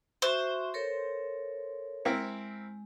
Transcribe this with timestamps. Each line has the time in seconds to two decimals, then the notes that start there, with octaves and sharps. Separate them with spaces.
0.22 F#4 C5 E5 C#6
0.74 A4 A#4 C#5
2.05 G#3 C4 E4 A#4